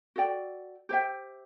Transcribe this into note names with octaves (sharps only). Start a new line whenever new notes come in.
F#4 A4 D5 G5
G4 C5 E5 G5